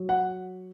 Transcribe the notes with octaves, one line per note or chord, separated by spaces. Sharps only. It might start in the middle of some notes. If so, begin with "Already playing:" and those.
Already playing: F#3
F#5